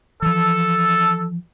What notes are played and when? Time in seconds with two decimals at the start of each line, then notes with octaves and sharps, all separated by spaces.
0.22 E3 F3 A4